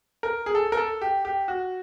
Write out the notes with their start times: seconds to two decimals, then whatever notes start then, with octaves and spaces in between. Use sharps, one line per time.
0.23 A#4
0.46 G#4
0.55 A4
0.72 A#4
0.77 A4
1.01 G4
1.25 G4
1.48 F#4